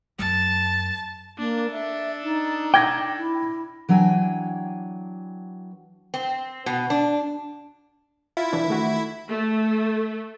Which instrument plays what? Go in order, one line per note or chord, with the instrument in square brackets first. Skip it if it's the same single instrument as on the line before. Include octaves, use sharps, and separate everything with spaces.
[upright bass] F#2 [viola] A5
[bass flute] A#3 [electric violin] D4
[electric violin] D4 A4 [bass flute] E5
[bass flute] D#4
[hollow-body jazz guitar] G5 [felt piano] D6 G#6 A#6
[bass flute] E4
[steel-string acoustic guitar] E3 F#3 D4 G5 G#5
[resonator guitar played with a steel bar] C4
B2
D4
[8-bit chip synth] E4 [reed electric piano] F4
[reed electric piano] E3 D4
D#3 A3 F#4
[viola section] A3